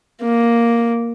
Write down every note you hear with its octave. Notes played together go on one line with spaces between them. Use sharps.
A#3